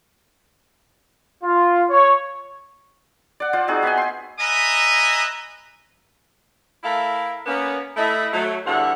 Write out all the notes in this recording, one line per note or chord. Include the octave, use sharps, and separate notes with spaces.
F4
C#5
D5 F#5
F4 C5 D5
C4 D#4 F#4 G#4
B3 E5 G5 G#5
G5 C6
B4 D#5 E5 G#5 A#5 D#6
A3 E4 A#4 E5 F5
A#3 B3 C#4
A3 E4 D#5
F#3 A3
E2 D3 G3 C#5 E5 F#5